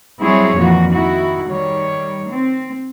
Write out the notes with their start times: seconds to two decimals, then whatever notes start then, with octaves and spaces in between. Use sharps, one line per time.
0.20 F#3 G3 C4 E4 G#4 C#5
0.56 F2 A#2 E3 F3 F#4
0.92 D#3 E4 F#4
1.48 D#3 G3 C#5
2.30 C4